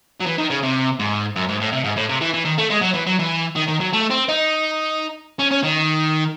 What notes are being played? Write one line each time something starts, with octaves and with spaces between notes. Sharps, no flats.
F#3
E3
D#3
C#3
C3
G#2
F#2
G#2
A2
C3
G#2
A2
C3
E3
E3
D#3
A3
G#3
F#3
E3
F#3
E3
D#3
D#3
F#3
A3
C4
D#4
C#4
C#4
D#3